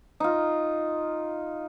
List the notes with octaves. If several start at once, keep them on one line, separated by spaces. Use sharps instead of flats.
D#4 F4